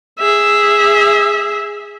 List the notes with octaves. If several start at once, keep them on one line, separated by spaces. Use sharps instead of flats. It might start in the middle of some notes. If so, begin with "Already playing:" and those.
G#4 E5